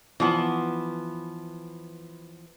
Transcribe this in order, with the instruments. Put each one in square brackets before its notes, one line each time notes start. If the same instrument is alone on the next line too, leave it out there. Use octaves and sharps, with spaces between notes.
[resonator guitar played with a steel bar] E3 F3 B3